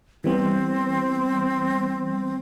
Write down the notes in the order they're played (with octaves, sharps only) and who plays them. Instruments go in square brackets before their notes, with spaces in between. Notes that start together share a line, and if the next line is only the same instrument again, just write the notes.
[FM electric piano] E3 G3 B3 [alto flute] C4